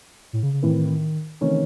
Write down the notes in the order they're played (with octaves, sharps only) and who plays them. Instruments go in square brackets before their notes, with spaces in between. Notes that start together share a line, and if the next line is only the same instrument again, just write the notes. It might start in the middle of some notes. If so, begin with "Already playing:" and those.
[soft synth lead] A2
C#3
C#3
[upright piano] A2 E3 C4 E4 [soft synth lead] D#3
[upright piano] C3 D#3 A3 C#4 [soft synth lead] E3